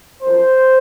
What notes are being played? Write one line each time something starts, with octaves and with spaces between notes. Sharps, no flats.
F#2 F3 C5